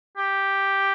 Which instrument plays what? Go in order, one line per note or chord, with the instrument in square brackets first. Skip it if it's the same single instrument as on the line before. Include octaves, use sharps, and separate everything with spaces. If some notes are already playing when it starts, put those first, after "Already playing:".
[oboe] G4